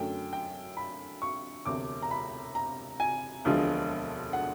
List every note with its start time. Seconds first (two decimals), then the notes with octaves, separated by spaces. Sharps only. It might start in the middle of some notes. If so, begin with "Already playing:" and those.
Already playing: F#2 D3 F#3 A3 G5
0.33 G5
0.77 B5
1.22 C#6
1.65 E1 D2 C3 D6
2.02 A#5
2.11 B5
2.55 A#5
3.00 G#5
3.45 E1 D2 D3 F3 G#3
4.33 F#5